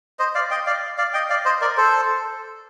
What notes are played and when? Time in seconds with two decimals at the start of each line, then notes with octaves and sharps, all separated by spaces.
0.19 C5 D#5
0.35 D5 F5
0.51 D#5 G5
0.67 D5 F5
0.98 D5 F5
1.14 D#5 G5
1.30 D5 F5
1.45 C5 D#5
1.61 A#4 D5
1.77 A4 C5